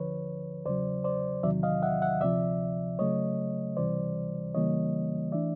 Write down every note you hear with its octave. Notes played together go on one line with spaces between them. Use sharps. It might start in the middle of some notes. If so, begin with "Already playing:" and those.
Already playing: D2 D3 F3 B4 C#5
E2 C#3 F#3 C5 D5
C5 D5
E2 C3 D#3 F#3 D5 E5
D#5 F5
E5 F#5
E5 F#5
D2 C3 F3 D5 E5
C#3 F#3 A3 C#5 D#5
C#2 C3 E3 G3 C5 D5
C#2 C#3 E3 G3 A#3 C#5 D#5
E3 A3 D4 D5 E5